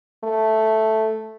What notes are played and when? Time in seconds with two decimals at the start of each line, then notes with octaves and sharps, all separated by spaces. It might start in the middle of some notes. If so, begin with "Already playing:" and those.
0.23 A3